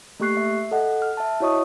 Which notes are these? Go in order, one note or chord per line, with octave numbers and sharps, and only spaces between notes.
A3 A#3 G4 C#6 F#6 C7
E5
A4 D#5 F#5
F6
E5 A5
E4 F#4 C#5 D#5 C#6 D#6